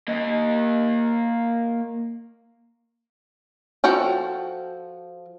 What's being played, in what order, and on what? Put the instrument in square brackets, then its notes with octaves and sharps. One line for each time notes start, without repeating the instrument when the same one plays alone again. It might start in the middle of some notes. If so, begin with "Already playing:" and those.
[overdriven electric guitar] A#3 D#5
[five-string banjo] F3 F#4 A4 G5